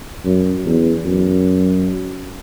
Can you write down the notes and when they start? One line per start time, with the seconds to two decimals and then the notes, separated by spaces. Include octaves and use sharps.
0.25 F#2
0.65 E2
1.05 F#2